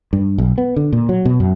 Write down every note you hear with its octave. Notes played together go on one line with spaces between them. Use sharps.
G2
B1
B3
D3
A#2
F#3
B2
F#2